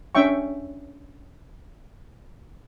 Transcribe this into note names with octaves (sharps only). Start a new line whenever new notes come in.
C#4 D4 E5 G5 C#6